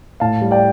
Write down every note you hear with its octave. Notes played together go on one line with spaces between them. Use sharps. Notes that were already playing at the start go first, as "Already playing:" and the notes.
A2 F5 A5
G3
D5 G5